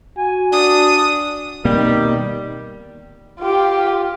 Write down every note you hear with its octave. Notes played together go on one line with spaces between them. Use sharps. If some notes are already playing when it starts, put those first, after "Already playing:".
F#4 G#5
D4 D#6
B2 D#3 G3 A#3 C4
F4 G4